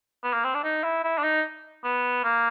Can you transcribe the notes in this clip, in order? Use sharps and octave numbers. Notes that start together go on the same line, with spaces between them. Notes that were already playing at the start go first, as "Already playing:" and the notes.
B3
A#3
C4
D4
D#4
E4
E4
D4
D#4
B3
A#3